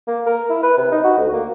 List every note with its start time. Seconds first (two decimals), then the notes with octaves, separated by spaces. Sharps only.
0.08 A#3
0.26 A#4
0.50 E4
0.63 B4
0.78 C3
0.92 D#4
1.04 F#4
1.18 D2
1.33 A#3